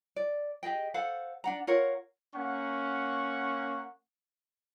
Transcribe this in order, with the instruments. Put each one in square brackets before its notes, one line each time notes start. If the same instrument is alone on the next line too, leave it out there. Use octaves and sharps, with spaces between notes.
[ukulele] D5
G4 G#4 D#5 G5
A4 C5 F5 F#5
D4 F#5 A#5
F4 A#4 C#5 F#5
[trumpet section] A#3 C#4 F#5 C#6